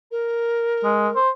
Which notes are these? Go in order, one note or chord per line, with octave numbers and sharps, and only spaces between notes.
A#4
G#3
C5